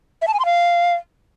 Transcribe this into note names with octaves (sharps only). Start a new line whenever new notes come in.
E5
A5
G#5
C6
F5